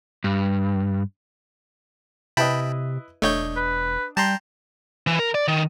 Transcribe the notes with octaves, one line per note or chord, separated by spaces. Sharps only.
G2
C3 E4 B4 D#5 G5 A5 B5
E1 A3 D4 C#5 D#5 G6
B4
G3 G5 A5 A#5 C6
E3
A#4
D5
D#3